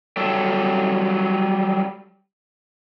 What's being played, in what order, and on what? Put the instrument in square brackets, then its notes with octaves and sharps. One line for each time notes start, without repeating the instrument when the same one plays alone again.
[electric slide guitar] F#3 G3 A4